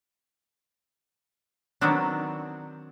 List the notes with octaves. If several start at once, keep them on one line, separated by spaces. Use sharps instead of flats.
D#3 F#3 B3 C4 D4